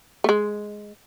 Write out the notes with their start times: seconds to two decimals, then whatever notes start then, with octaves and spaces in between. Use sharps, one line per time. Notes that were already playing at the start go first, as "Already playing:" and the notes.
0.24 A3
0.29 G#3